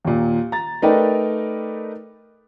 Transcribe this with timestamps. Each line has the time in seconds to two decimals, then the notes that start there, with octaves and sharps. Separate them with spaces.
0.05 D#2 A#2
0.52 A#5 A6
0.82 A3 D#4 A#4 B4 D5 G5